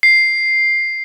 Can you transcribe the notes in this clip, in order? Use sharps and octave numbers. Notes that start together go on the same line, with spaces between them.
C7